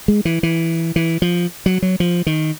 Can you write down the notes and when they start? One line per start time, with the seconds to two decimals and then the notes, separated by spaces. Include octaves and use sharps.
0.08 G#3
0.25 E3
0.43 E3
0.96 E3
1.22 F3
1.66 F#3
1.82 F#3
2.00 F3
2.26 D#3